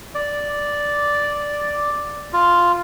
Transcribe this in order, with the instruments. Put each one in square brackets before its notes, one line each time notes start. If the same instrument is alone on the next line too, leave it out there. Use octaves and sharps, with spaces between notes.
[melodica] D5
F4